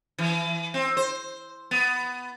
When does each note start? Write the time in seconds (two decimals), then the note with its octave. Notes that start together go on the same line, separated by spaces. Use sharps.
0.18 E3
0.74 C4
0.97 C5
1.71 B3